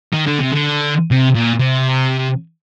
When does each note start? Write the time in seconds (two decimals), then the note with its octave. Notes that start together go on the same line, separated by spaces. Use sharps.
0.13 D#3
0.26 D3
0.39 C3
0.52 D3
1.11 C3
1.35 A#2
1.60 C3